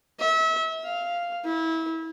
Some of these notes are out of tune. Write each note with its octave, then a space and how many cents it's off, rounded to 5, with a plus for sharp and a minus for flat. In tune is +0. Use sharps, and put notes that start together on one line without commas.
E5 -30
F5 -5
E4 -25